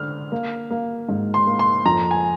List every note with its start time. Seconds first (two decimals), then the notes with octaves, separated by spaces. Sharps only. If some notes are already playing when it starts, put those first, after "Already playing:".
Already playing: D3 D4 F6
0.32 A#3
0.70 A#3
1.09 G#2
1.34 C6
1.47 A#3
1.59 C6
1.85 F2 A#5
2.11 G#5